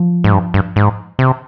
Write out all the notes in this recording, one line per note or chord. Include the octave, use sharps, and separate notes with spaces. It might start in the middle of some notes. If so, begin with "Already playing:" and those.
Already playing: F3
G#2
G2
G2
G#2
C3